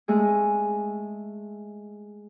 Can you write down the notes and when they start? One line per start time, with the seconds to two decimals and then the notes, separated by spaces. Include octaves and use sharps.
0.08 G#3 A3 G#4